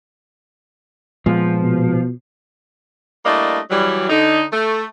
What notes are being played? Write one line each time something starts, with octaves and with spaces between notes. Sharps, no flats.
A#2 F3 G#3 B3
B2
G3 A3 A#3 D4 E4 D#5
E3 F#3 G3
D3 D#4
A3